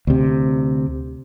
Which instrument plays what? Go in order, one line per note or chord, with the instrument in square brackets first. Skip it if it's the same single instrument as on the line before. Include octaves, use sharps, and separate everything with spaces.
[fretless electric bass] D2 C3